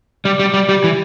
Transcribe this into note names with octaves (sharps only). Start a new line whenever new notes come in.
G3 D5
G3
D5
G3
G3 G4
E3